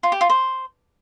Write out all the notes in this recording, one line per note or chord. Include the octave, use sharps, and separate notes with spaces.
F4
G4
F4
C5